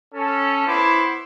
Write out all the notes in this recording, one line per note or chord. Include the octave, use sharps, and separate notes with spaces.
C#4 A4
B3 E4 C5 D6